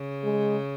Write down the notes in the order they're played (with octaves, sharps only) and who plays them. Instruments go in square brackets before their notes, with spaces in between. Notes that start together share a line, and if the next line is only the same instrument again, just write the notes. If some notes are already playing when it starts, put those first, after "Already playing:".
Already playing: [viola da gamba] C#3
[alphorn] G#3